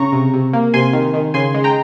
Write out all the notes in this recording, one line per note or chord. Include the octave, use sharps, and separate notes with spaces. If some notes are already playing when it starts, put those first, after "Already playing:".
Already playing: C#3 A#5 C#6
C3
C3
A#3
C3 G#5 C6
D#3
D#3
C#3 G#5 C6
G#3
G5 A#5